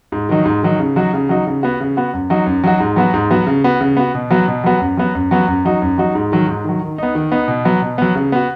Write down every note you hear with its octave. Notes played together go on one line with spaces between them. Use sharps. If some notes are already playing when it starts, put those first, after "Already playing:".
G#2
D#3 F#3 D#4
G#2
D#3 F#3 D#4
C#3
F#3 D#4 F#4
C#3
F#3 D#4 F#4
C#3
B3 F#4
C#3
B3 F#4
F#2
F#3 D#4 F#4
F#2
F#3 D#4 F#4
G#2
F#3 B3 F#4
G#2
F#3 B3 F#4
C#3
B3 F#4
C#3
B3 F#4
B2
F#3 B3 F#4
B2
F#3 B3 F#4
F#2
F#3 B3 F#4
F#2
F#3 B3 F#4
F#2
F#3 D#4 F#4
F#2
F#3 D#4 F#4
G#2
D#3 F#3
G#2
D#3 F#3
D#3
B3 D#4
D#3
B3 D#4
B2
F#3 B3
B2
F#3 B3
C#3
B3 F#4